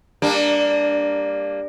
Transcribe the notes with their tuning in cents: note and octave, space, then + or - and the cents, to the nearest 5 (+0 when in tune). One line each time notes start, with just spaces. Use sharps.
G3 +25 A#3 +0 D4 +0